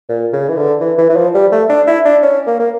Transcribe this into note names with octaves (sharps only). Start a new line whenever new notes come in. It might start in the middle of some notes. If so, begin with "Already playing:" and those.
A#2
C#3
E3
D3
E3
E3
E3
F3
G3
A3
D4
E4
D4
C#4
A#3
A#3